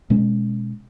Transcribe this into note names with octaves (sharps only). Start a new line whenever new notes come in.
B2 G#3 C#4